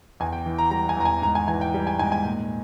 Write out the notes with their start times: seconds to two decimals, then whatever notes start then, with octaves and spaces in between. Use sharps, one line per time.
0.20 E2 G#5
0.33 G5
0.46 E3
0.58 A#5
0.71 G3 A#5
0.89 G#5
0.97 E2 A#5
1.05 G#5
1.22 G#2 A#5
1.35 G#5
1.48 E3 G#5
1.61 G5
1.74 G3
1.87 G#5
1.99 G#2 G#5
2.12 G#5
2.25 A#2